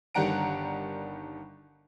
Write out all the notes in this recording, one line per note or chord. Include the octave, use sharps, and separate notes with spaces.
G1 D#3 G3 F#5 A#5 D7